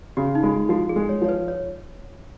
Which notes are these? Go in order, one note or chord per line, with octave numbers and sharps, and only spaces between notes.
C#3 F#4
D#4
G#3 F4
F3 F#4
G#4
G#3
C#5
F3 C#5
B4
C#5